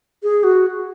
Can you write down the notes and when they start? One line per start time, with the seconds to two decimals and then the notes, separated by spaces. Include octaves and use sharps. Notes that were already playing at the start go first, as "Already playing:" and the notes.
0.23 G#4
0.44 F#4